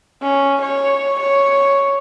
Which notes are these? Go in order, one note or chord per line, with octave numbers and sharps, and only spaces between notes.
C#4
C#5
C#5